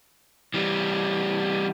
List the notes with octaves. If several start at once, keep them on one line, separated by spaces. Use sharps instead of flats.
E3 G3